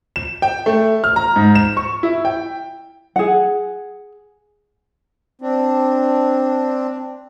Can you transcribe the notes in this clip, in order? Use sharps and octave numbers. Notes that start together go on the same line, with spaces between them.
E7
G5
A3
F6
A#5
G#2
E7
C#6
E4
G5
G#4 F#5
C4 D4